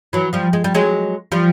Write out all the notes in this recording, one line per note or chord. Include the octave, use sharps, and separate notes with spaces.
E3 F#3
F3 G3
G#3
G3
F#3 G#3
F3 G3